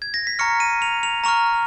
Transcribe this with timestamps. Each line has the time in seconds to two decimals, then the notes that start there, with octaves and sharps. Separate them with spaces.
0.02 G#6
0.14 A#6
0.27 B6
0.39 A#5 C#6 F6 C#7
0.60 D#7
0.82 F7
1.03 F7
1.24 A#5 C#6 F6 F7